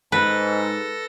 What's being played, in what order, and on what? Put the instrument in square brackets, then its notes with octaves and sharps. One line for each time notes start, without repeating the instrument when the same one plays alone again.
[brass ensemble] G#2 [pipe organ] A4 A6 A#6 [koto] B4